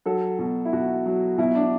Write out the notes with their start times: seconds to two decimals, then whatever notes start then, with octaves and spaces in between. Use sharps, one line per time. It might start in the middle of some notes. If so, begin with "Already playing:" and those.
0.06 F#3 A4
0.39 B2
0.65 E4
0.73 B2 F#4
1.06 F#3
1.38 B2 E4
1.55 D4